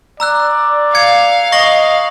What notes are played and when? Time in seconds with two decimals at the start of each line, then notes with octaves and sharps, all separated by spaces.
0.20 D5 A#5 E6 F#6
0.95 F5 G#6 C#7
1.52 D#5 C#6 A#6 F#7